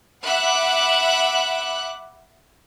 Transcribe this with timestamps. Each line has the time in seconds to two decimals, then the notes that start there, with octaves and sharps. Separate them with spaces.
0.24 E5 F#5 B5 D6 F#6